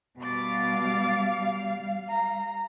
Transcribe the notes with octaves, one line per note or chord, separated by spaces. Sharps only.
B2 G3 F5 D6 A6
A#5